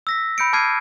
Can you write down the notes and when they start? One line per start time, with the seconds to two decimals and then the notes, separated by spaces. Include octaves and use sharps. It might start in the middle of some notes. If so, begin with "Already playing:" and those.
0.07 E6 A#6 B6
0.38 B5 G6 C#7 D7
0.53 A5 D6 F6 G#6 C7 D#7